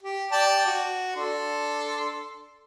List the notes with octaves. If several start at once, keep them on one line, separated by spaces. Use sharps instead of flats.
G4
D5 G5 A5
F#4
D4 A4 C6